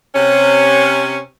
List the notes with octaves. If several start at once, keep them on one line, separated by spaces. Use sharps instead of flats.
C3 C#4